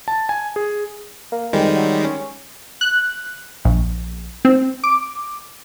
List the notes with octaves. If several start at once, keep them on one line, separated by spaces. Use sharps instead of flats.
A5
G#5
G#4
A#3
F2 D#3 G3 G#3
F#3
C#4
F#6
A#1
C4
D6